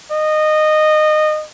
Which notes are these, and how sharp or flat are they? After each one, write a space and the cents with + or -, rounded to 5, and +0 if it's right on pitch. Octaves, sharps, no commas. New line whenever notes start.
D#5 -20